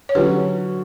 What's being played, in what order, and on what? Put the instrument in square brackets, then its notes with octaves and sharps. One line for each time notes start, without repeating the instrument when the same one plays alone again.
[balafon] C#5
[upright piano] D3 F#3 C#4 F#4 [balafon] G4 B4